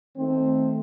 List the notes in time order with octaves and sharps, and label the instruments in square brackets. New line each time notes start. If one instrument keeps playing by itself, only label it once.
[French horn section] D#3 A3 C4